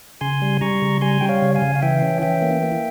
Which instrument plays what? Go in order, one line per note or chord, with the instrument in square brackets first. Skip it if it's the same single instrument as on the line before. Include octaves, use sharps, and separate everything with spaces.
[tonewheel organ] C#3 G#5 C6
G3
G3 A#5 C#6
C#3
G3 G#5 C6
G3 G5
C#5 F5
C#3
F5 G#5
C#3
F5
E3 E5 G5
C#4
E3 E5 G5
A#3
A#3